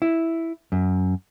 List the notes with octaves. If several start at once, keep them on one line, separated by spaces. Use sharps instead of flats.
E4
F#2